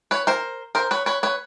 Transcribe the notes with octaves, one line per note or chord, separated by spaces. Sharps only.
B4 C#5
A#4 C5
A#4 C5
B4 C#5
B4 C#5
B4 C#5